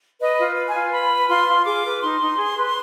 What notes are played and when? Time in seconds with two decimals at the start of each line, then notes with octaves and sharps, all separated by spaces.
0.19 B4 D#5
0.38 F4
0.56 B4
0.68 G#5
0.74 F4
0.93 B4 B5
1.10 B4
1.29 F4 C6
1.48 F4
1.65 G#4 D6
1.84 B4
2.02 D#4 C6
2.21 D#4
2.38 G#4
2.57 B4